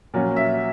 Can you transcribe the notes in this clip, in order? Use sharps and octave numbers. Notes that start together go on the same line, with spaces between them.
A#2 F#3 C#4
E5